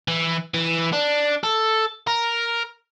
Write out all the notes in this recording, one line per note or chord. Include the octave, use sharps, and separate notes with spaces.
E3
E3
D4
A4
A#4